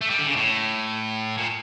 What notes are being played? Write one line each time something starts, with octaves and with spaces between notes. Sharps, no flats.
A3
G3
D3
C#3
A2
A#2